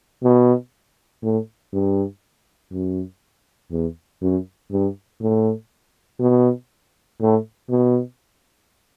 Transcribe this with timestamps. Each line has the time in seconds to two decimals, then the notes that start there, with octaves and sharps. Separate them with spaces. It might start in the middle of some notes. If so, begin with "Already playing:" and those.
0.23 B2
1.23 A2
1.73 G2
2.72 F#2
3.72 E2
4.22 F#2
4.71 G2
5.22 A2
6.20 B2
7.21 A2
7.70 B2